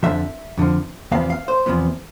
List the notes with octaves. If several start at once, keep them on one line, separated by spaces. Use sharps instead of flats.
F2 D3 F3 E5
F2 D3 F3
E2 C3 F3 B3 F5
F5
C5
E2 C3 F3 B3